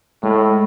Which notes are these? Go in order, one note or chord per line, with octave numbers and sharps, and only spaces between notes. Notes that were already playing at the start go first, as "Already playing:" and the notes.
A2 G#3